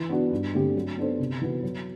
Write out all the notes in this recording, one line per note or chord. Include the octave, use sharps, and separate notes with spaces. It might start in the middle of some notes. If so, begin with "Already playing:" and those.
Already playing: E3
B3 D4 F#4
G2
D3 A3 C4 G4
F#3
B3 D4 A4 C5
C3
E3 B3 F#4 B4
F#3